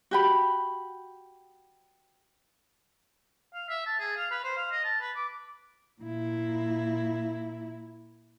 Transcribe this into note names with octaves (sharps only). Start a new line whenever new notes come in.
F#4 G4 B5
F5
E5
A5
G#4
F5
B4
C5
F5
D#5
A5
B4
D6
A#2 E4